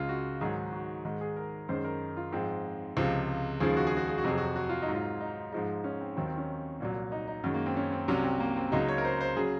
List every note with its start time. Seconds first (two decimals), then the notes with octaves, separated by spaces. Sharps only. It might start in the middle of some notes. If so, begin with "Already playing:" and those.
Already playing: C#2 C#3 G#3 F4
0.09 F#4
0.41 G#2 D#3 F#3 G#4
0.72 F#4
1.05 G#2 D#3 G#3
1.21 G#4
1.36 A#4
1.69 F#2 D#3 G#3 C5
1.85 A#4
2.17 F4
2.32 G#2 F3 G#3 C4
2.97 C#2 C3 F3 G#3
3.60 D#2 C#3 F3 G#3 G#4
3.77 F#4
3.87 G#4
3.97 F#4
4.08 G#4
4.18 F#4
4.24 F2 C3 F#3 G#4
4.38 F#4
4.56 F#4
4.69 F4
4.82 D#4
4.88 G#2 F#3
4.95 F4
5.21 D#4
5.52 G#2 F3 G#3 D#4
5.84 C#4
6.01 C4
6.16 D#2 D#3 F#3 C4
6.27 C4
6.38 C#4
6.80 C2 A#2 F#3
7.12 D#4
7.28 D#4
7.44 F#2 D#3 G#3 F#4
7.54 A#3
7.66 C4
7.76 C#4
7.92 C4
8.08 C2 C3 F#3 C#4
8.24 C4
8.40 A#3
8.56 C4
8.72 C#2 C#3 F#3 D#4
8.88 C#5
8.98 A#4
9.05 C5
9.21 C5
9.36 C#3 F#3 G#4